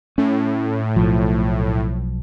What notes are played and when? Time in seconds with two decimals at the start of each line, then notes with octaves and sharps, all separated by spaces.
0.18 A2 C#4
0.96 B1 F3